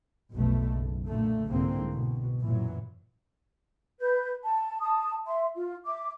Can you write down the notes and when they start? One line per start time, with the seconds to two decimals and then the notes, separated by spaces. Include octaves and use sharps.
0.34 F1 B1 B2 A3
0.73 F#1
1.09 A#2 D3 A3
1.48 C2 G#2 D3 A#3 C4
1.93 B2
2.43 F#2 A#2 E3 F#3
4.00 B4 G6
4.45 A5
4.81 A5 D#6
5.26 E5 C6
5.55 F4
5.85 E5 D6